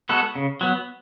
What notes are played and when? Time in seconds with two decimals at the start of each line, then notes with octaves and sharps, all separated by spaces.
0.09 G#3 B3 F#4 A4
0.35 C#3
0.61 F#3 B3